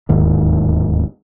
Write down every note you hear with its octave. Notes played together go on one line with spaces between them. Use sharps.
D1 D#2 G#2 D#3